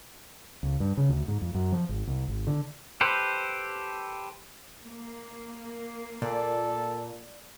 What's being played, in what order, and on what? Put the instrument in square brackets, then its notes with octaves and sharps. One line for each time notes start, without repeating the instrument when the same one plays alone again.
[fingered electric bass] C#2
G2
C#3
D2
G#2
F2
F#2
F3
G#1
C2
G#1
D3
[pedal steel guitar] G4 A4 B4 C5
[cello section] A#3
[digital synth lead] A#2 [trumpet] A4 [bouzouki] D5